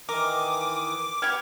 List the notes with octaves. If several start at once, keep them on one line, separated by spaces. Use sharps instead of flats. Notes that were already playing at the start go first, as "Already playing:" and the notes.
D#3 E3 A#4 D6 D#6
B3 G4 F6 G#6